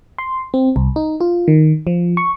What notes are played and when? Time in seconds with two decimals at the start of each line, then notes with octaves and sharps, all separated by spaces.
0.18 C6
0.54 C4
0.76 C2
0.96 D#4
1.21 F4
1.48 D#3
1.87 F3
2.17 C#6